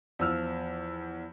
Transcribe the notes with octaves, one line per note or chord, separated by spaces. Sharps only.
E2 F3 E6 F6